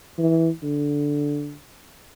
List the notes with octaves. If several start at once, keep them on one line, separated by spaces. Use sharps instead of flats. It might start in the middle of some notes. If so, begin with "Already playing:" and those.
E3
D3